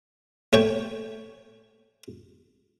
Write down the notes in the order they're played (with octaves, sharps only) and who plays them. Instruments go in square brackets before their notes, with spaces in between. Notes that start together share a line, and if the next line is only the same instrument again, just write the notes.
[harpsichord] A3 C#5 G5